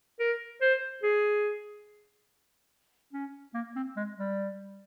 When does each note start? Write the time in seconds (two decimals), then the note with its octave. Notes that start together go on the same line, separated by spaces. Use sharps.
0.20 A#4
0.61 C5
1.03 G#4
3.13 C#4
3.54 A#3
3.76 C4
3.97 G#3
4.18 G3